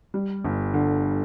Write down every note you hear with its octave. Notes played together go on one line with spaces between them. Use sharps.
G3
G1
D3